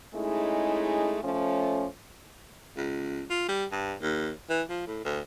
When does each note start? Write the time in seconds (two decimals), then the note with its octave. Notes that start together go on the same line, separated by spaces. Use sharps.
0.14 G#3 A3 C#4 D#4 E4 G#4
1.24 F3 A3 C#4
2.77 C#2
3.30 F4
3.48 G3
3.72 G2
4.01 D#2
4.49 E3
4.69 F3
4.87 A2
5.05 D2